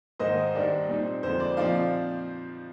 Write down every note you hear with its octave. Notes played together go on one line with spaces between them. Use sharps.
G#2 D#3 A#3 D#4 C5 D#5
G2 D#3 G3 D4
A#2 G3 C4 D#4
F2 D3 G#3 C5
D5
A#2 F3 C4 D#4 D5 F5